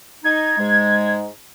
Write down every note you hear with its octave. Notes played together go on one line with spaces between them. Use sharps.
D#4 G#6
G#2 G#3